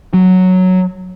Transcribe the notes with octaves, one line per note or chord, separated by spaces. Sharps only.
F#3